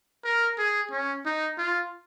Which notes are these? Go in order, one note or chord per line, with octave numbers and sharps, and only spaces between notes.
A#4
G#4
C#4
D#4
F4